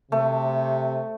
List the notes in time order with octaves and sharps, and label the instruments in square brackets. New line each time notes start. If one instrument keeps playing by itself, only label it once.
[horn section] C3 [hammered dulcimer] A3